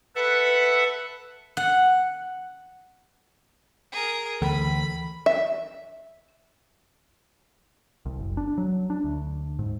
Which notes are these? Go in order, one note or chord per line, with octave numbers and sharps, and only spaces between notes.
A4 B4 E5 F#5
F#5
G#4 A#4
D2 E3 B5
E5
C2
F#1
D4
F#3
D4
D2
G#2